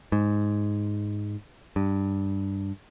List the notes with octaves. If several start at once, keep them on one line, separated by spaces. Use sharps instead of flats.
G#2
G2